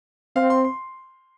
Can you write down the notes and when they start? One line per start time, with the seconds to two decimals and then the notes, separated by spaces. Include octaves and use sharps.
0.36 C4 F5
0.50 C6
0.64 C6